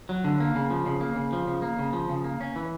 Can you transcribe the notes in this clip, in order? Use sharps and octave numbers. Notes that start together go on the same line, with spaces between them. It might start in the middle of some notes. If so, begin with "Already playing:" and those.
F#3
D3
A#3
C#3
F3
C#3
A#3
C#3
F3
C#3
A#3
C#3
F3
C#3
A#3
C#4
E3